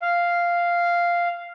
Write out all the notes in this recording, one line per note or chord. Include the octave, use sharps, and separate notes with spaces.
F5